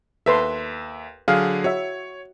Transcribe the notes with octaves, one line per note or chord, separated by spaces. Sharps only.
D#2 A4 B4 E5 C6
D3 F#3 G#4 F5
F#4 C#5 E5